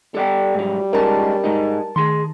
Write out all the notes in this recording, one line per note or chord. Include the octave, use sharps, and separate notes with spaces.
G3 A4 D5 G5
G#2 F#3
G#3 C#4 D#4 A#4 A5
G#2 G#3 D#4
D#3 G#4 C6